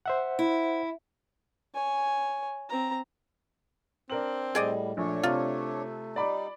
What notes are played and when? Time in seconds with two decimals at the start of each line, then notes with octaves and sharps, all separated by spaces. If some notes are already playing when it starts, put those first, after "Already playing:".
0.06 C5 E5 F#5
0.39 E4
1.75 C#5 G#5
2.69 C4 A#5
4.10 C4 D4 A#4 F#7
4.55 A2 G3 G#4 D5 D#5
4.97 A#1 A3 D4 C#5
5.23 C3 F4
6.16 G3 D#4 D5 B5 D6